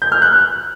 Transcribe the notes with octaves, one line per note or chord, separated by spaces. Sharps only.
G6
F6
F#6